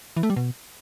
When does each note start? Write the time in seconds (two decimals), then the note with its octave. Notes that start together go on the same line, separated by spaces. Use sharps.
0.17 E3
0.23 A3
0.30 G3
0.36 B2